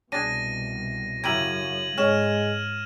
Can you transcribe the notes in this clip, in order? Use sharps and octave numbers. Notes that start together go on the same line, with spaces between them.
C2 B2 D4 G#4 A#6 D#7
F#2 C#3 E4 G4 A#4 G#6 D#7 F#7
G#2 G#3 C#4 F6 E7